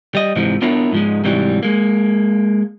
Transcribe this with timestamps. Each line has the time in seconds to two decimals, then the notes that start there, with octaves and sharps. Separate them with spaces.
0.15 G3 D#5
0.36 G#2 C3 E3 F3
0.62 B3 D4 E4 F4 A#4 C#5
0.92 G#2 F3 G#3
1.24 G#2 C3 E3 F#3 G3
1.63 G#3 A#3